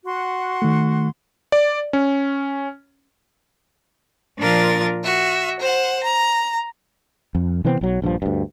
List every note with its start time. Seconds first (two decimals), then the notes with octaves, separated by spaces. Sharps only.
0.05 F#4 F#5 C6
0.62 D#3 A3
1.52 D5
1.93 C#4
4.39 A#2 F3 D4 F4 A#4 A6
5.03 F#4 E5
5.60 C5 F#5
6.03 A#5
7.35 F2
7.65 C3 E3 B3 C4
7.81 B1 F#3
8.02 A#1 G2 D#3 F3
8.22 D2 G2